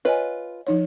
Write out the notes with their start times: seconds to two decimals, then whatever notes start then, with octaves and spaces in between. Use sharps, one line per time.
0.05 F4 B4 C#5 D#5 G#5
0.67 F3 D#4 C#5